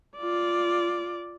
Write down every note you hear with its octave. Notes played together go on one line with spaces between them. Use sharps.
F4 D5